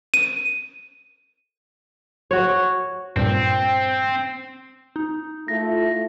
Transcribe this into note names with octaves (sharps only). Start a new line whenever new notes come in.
D#7
F#4 C#5
G2 A#2 F3 C4
D#4
A3 E4 F4 A4 A#6